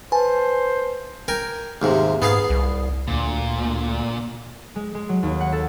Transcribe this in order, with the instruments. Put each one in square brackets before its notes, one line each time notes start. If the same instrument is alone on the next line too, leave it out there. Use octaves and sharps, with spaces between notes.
[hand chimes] B4 A5 [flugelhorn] C5 [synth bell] G#5
[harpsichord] A#4 G5 G#5
D#2 G#2 C3
[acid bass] G#2 [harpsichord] B3 G#4 F5
[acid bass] C2
[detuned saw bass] D2 [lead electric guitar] A#2
[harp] G#3
G#3
F#3
D#2
F#5
A4